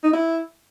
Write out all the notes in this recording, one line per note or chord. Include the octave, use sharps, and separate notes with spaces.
D#4
E4